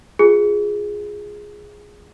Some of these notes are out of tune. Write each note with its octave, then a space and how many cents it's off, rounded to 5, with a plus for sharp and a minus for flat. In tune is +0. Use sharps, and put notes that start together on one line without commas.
F4 +10 G#4 +0